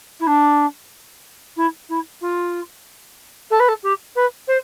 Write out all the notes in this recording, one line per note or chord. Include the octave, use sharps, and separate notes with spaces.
E4
D4
E4
E4
F4
A4
B4
A4
G4
B4
C5